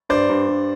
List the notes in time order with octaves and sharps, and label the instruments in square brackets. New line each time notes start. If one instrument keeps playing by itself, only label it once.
[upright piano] G2 [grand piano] C5 D5
[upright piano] G2
G2